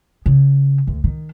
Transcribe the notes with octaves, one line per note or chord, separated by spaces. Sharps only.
C#3
D2
D#3